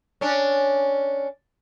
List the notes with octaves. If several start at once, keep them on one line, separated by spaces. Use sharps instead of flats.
C#4 D4